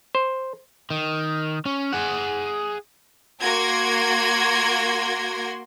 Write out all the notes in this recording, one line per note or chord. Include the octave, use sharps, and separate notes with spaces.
C5
D#3
C#4
G#4 F#5
A#3 F#4 C6 G#6 A#6 D7